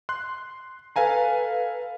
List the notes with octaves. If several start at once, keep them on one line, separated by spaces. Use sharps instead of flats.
C6 F#6
A4 B4 F5 G#5 A#5